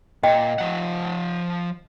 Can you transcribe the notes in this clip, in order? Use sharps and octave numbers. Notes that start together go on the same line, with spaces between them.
A#2 D#5 G5
F3 F#5